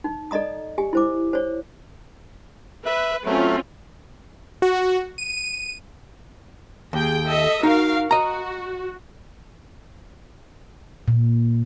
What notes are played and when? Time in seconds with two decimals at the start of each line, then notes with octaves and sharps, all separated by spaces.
0.04 D#4
0.31 A4 D5 D#5 A#5 D#6
0.78 G4 G#5
0.93 E4 C5 D6
1.33 C5 C#5
2.86 B4 E5
3.26 F#3 A3 C4 C#4 F4
4.62 F#4
5.18 D#7
6.93 D#2 G#4 G5
7.25 A4 D#5 E5
7.63 D#4 F#4 A#4 F5
8.11 F#4 D#5 A#5
11.08 A#2